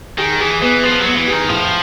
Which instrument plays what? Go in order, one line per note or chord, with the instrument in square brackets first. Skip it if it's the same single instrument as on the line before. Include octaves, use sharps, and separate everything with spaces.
[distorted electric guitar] D#3 [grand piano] G#4
[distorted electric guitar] E3 [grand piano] G#4
[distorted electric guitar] E3 [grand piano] B3
[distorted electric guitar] F3 [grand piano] B3
[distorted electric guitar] F#3 [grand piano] B3
[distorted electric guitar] E3
[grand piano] G#4
[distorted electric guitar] D#3
[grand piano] A2 [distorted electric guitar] F3